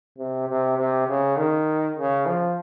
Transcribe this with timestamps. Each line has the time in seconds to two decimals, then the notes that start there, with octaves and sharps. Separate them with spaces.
0.18 C3
0.49 C3
0.77 C3
1.08 C#3
1.37 D#3
1.97 C#3
2.26 F3